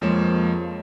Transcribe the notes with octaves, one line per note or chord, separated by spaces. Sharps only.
F2 F3 G#3 A#3 C#5 E7